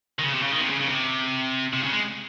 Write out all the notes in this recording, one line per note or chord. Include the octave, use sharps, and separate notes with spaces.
D#3
C#3
C3
C#3
D#3
C3
C#3
C#3
C3
C3
C#3
G#3